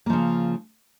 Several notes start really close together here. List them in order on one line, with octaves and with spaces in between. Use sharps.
A#3 F3 C#3